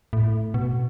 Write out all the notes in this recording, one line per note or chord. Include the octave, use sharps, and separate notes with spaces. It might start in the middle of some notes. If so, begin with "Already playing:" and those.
A2
B2